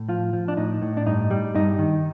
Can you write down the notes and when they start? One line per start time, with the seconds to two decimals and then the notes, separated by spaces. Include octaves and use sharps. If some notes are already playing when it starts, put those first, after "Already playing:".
Already playing: A2
0.09 F3 F4
0.33 F3
0.48 D4
0.57 A2 D#4
0.82 A2
0.97 D4
1.06 G2 D#4
1.31 G3
1.55 G2 D#4
1.79 D#3